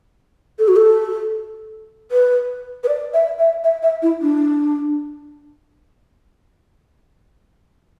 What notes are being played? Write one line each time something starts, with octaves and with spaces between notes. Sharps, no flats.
A4
F#4
A4
B4
B4
D5
E5
E5
E5
E5
E4
D4